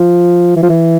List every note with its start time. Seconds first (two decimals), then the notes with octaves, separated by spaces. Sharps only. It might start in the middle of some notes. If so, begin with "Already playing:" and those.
Already playing: F3
0.56 E3
0.63 F3
0.70 E3